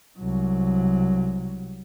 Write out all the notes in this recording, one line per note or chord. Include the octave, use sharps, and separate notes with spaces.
C2 F#3